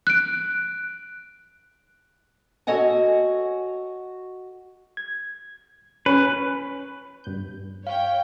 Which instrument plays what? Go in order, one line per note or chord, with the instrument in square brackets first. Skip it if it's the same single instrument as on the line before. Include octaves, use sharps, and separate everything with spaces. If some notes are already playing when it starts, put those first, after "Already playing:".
[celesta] F#6 D7
[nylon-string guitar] F#4 A4 C#5 D#5 F#5 G#5
[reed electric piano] G#6
[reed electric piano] C#4 [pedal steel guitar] B4
[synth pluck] G2 G6
[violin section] C#5 G5 [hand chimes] F5